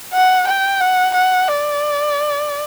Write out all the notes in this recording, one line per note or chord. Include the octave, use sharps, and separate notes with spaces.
F#5
G5
F#5
F#5
D5